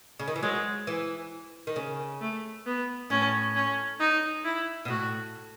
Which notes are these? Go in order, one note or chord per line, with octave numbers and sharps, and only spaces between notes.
C#3
D#3
E3
F#3 G#3
E3
D#3
C#3
A3
B3
A2 C#4
C#4
D#4
E4
B2
A2 F#4